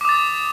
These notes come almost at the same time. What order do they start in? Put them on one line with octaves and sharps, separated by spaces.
D6 D#6 A6